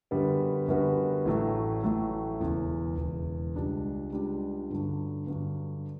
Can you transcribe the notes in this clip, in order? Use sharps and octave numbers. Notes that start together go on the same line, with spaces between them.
F#2 D3 G3 B3 F#4
F#2 D3 G3 B3 F#4
A1 A2 F#3 A3
A1 A2 F#3 A3
E1 E2 C#3
E1 E2 C#3
C#2 C#3 G3 D4
C#2 C#3 G3 D4
G2 D3 F#3
G2 D3 F#3